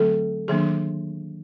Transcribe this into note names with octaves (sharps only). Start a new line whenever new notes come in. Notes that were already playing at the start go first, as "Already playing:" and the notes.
Already playing: D3 F#3 A3 C4 A4
D#3 F#3 A#3 D4 G#4